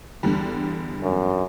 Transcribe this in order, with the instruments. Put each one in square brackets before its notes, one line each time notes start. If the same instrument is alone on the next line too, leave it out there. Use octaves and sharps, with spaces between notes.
[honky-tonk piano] E2 D3 G3
[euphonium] F#2